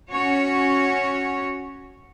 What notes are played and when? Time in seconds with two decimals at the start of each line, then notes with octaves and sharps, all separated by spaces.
0.11 C#4 F#4 C#5